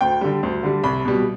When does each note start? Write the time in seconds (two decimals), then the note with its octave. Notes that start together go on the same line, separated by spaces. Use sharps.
0.01 D2 G5
0.21 D3 G3
0.43 D2
0.63 D3 G3
0.83 C2 B5
1.05 B2 G3